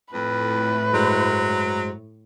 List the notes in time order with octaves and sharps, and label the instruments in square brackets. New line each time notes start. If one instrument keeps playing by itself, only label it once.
[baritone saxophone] F2 [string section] A2 [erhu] B4
[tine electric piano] G2 G#3 C5 [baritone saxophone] F#3